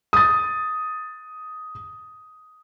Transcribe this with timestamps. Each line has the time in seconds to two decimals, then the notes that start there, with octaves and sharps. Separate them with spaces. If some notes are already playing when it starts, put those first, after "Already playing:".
0.13 D#6 A6